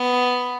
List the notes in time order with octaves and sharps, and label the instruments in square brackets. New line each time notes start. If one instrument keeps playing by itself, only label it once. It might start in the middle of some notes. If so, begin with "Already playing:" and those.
Already playing: [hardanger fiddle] B3